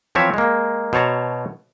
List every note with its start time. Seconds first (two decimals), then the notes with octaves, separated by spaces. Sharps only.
0.15 E3 F3 C4 C#5 E5
0.34 G#3 A#3
0.93 B2 C5 C#5 A5 A#5